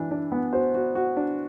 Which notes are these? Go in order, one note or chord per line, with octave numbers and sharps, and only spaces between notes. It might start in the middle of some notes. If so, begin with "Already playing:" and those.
Already playing: E3 D4
D4
B3
F#4 C5
F#4
F#4
D4